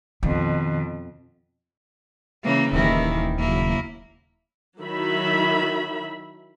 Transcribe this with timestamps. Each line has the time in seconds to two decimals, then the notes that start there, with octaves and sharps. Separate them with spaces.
0.23 F2 B2 D#3
2.43 C#3 E3 A#3
2.73 D#1 D#2 D#3 E3 A#3 E4
3.39 D#2 C#3 F#3 A#3 E4
4.80 D#3 F#3 E4 E5 B5